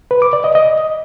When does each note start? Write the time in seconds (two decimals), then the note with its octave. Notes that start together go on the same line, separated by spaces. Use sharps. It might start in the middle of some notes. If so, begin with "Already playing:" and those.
0.11 B4
0.22 D6
0.33 D5
0.44 D#5
0.55 D#5